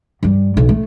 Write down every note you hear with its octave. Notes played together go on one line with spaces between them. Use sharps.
G2 G3
B1 D3
A3